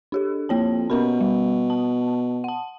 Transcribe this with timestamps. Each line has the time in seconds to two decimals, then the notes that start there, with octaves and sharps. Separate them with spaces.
0.12 D4 G4 A4
0.49 F2 A#3 C#5 A5
0.90 B2 C#4 A#4 B5
1.21 G3
1.70 A5
2.44 F#5 A5